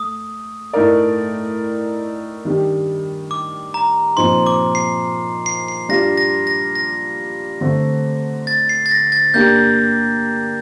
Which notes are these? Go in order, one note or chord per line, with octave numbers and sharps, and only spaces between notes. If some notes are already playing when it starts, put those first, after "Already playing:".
Already playing: A3 D#6
A2 A3 D#4 A#4 D5
D#3 G3 D4 G4
D6
A#5
A#2 F3 C4 D#4 C6
D6
C7
C7
C7
G3 D4 F4 A#6
A#6
A#6
A#6
D3 A3 C4
A6
C7
A6
A#6
A6
A#3 D4 G4 G6